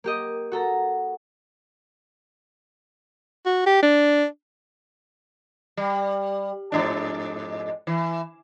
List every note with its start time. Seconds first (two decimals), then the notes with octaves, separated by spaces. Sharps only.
0.04 A#3 G4 D#5
0.52 F#4 A4 A#5
3.46 F#4
3.66 G4
3.83 D4
5.77 G3
6.72 F2 G#2 D4
7.87 E3